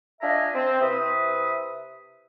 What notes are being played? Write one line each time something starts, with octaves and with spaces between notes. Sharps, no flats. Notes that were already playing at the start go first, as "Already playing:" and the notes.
D4 F4 D#5 E5 G#5 A#5
C4
C3 E4 B4 E5 D#6